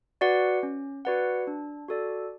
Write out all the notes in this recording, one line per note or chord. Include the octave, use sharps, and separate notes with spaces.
F#4 B4 D5 F#5
C#4
F#4 B4 D5 F#5
D4
F#4 A4 D5